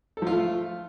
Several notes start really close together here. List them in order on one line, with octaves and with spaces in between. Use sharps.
A4 F3 F4 A3